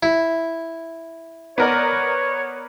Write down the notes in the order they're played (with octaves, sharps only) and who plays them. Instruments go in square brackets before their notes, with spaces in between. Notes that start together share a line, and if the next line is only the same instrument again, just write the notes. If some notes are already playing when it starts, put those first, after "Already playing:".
[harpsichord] E4
[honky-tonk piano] B3 A#4 D5 [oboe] C#5